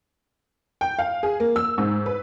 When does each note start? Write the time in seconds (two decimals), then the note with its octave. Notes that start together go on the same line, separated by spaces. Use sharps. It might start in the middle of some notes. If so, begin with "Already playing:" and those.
0.81 G5
0.99 F5
1.23 G#4
1.40 A#3
1.56 E6
1.78 G#2
2.06 B4